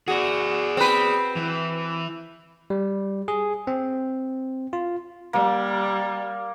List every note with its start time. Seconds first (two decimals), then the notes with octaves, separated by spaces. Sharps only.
0.08 F#4 G#4 D5
0.77 C4 B4
1.36 E3
2.70 G3
3.28 G#4
3.67 C4
4.73 F4
5.33 G3 A#3